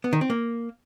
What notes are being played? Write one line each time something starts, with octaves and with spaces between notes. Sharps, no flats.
B3
D#3
C4
A#3